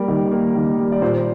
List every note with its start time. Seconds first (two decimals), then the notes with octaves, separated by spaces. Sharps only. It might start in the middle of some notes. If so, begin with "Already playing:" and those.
Already playing: G3 A#3 A#4
0.08 D#3
0.31 A#3
0.55 D#3
0.78 G3
0.92 D5
1.02 A#2 C5